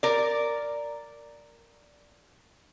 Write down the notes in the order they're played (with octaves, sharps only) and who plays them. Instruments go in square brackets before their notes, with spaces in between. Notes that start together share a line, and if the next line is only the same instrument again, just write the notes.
[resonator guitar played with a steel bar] A#4 D5